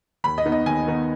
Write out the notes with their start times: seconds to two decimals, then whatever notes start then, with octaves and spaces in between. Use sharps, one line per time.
0.24 D#2 B5
0.38 D#5
0.45 D#3 B3 D#4
0.52 D#5
0.66 D#2 G#5
0.87 D#3 B3 D#4